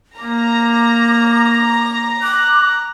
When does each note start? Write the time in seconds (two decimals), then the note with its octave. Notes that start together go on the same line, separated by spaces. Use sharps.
0.19 A#3 A#5 D6
2.23 D6 F#6